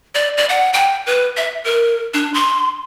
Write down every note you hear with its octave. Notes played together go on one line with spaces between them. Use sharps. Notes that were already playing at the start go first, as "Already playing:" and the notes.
D5
D5
F#5
G5
B4
E5
A#4
D4
C6